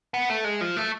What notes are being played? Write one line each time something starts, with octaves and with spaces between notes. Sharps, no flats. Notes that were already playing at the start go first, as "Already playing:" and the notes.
B3
A3
G#3
F3
A3